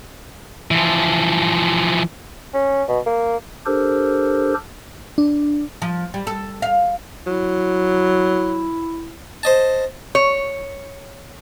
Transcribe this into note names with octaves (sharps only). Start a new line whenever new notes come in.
E3 F3
C#4
B2
A#3
D4 G4 A4 A#4 C5
D4
F3
G3
A4
F5
F#3 E4
C5 D#5 A5
C#5